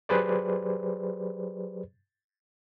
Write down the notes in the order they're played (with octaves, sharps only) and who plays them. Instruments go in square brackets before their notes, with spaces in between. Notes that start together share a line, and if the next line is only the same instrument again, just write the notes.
[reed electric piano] F#3 G4 G#4 B4 C5 D5